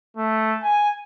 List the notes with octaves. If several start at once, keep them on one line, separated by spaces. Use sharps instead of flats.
A3
G#5